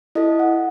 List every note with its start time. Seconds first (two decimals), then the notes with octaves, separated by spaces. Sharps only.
0.15 E4 A4 D#5
0.39 F#5